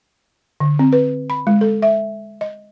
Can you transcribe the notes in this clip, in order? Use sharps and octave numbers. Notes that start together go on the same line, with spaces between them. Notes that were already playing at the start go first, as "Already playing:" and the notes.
D3
C4
B4
B5
G#3
A4
E5
D#5